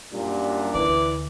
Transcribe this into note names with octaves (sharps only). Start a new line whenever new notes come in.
F#2 A#2 G3 D4
D2 E3 D5